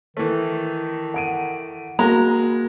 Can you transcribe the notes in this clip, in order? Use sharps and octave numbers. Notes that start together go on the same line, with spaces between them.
D#3 E3 A3
F#5 D7 D#7
G#3 A#3 F#4 A#5